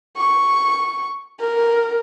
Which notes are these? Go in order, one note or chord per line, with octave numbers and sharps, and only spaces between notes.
C#6
A#4